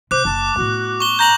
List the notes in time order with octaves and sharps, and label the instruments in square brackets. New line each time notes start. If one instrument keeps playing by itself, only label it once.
[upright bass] C3 [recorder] C5 [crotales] D6 F#6
[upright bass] F#1 [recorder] A5
[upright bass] A2 B3 [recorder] F#4
[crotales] C#6 G7
[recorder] A#5 [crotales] G6 A#6 F#7